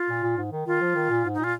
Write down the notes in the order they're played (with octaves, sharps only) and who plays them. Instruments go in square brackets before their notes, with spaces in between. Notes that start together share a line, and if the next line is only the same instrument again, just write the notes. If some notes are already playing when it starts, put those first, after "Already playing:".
Already playing: [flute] F4
[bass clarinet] A#2
A#2
G#2
D#3
[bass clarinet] D#3 [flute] F4
[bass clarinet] F3
D#3
A#2
G#2
[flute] D#4
[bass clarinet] A#2
[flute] F4